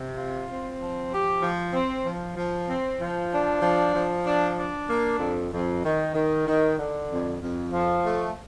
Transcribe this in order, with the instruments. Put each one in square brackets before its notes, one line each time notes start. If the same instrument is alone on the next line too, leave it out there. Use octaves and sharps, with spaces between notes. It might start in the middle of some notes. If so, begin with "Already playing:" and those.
Already playing: [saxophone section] C3
F4
C4
F3
G4
F3
C4
F3
F3
C4
F3
D4
F3
F3
D4
D4
A#3
F2
F2
D#3
D#3
D#3
D3
F2
F2
F3
A3